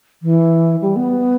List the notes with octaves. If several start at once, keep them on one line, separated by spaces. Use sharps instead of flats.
E3
G3
B3